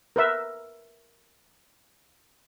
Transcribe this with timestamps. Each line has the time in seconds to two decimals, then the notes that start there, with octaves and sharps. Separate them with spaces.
0.16 A#4 B4 E5